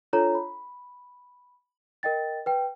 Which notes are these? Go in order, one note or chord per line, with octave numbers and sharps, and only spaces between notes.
D4 F4 A4 C#5 A#5
B5
A#4 D#5 G5 A6
B4 G5